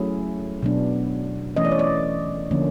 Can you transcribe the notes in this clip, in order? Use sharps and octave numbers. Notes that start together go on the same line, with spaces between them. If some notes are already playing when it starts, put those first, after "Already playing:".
Already playing: F#3 A3 C#4 E4 G#4
B2 F#3 B3 D4
E3 A3 C#4 D#5
D5
C#5
D5
D3 F3 A#3 C#4